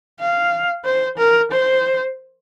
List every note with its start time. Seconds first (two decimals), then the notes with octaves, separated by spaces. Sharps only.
0.20 F5
0.85 C5
1.18 A#4
1.52 C5